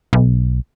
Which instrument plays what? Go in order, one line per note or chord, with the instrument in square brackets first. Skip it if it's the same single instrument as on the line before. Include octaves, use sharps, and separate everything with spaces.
[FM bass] B1